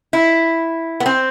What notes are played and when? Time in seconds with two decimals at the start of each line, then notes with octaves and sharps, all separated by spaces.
0.13 E4
1.00 B3
1.06 C4